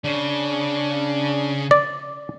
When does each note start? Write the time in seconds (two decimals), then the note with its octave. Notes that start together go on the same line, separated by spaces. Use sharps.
0.04 C#3 D4
1.71 D5